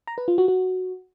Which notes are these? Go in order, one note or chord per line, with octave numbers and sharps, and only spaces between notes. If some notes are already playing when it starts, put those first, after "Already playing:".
A#5
B4
F4
F#4
F#4